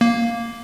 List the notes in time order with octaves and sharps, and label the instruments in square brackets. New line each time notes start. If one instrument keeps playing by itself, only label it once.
[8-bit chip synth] A#3